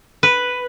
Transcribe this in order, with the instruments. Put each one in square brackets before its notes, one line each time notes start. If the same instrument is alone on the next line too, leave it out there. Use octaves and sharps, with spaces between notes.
[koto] B4